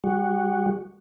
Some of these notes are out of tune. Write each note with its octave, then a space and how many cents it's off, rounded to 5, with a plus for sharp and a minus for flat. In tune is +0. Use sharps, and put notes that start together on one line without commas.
G3 +30 F#4 +0